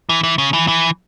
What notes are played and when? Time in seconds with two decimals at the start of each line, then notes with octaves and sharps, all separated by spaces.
0.09 E3
0.23 E3
0.38 C#3
0.53 E3
0.68 E3